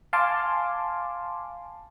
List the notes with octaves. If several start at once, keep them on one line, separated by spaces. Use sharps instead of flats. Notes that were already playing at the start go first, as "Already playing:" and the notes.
F5 G#5 A5 C6 D6